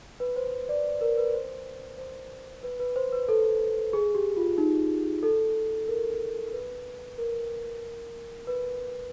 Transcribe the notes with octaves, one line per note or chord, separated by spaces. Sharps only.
B4
C5
D5
A#4
B4
C5
C5
B4
B4
C5
B4
A4
G#4
G4
F4
D#4
A4
A#4
B4
A#4
B4